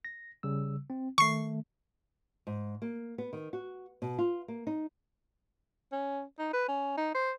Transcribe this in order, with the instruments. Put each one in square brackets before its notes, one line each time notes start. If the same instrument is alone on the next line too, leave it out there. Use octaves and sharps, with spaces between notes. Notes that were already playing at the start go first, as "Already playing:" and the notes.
[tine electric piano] A#6
C#3 G3 E6
C4
[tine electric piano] D#3 A3 [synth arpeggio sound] C#6 C7
[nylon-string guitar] G#2
A#3
B3
D#3
F#4
B2
F4
A#3
D#4
[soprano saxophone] C#4
D#4
B4
C#4
D#4
C5